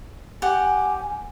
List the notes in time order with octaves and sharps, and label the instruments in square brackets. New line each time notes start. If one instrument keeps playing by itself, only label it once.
[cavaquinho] G4 F#5 [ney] G#5